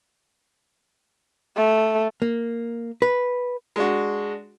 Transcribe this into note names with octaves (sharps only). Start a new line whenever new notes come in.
A3
A#3
B4
G#3 D4 F#4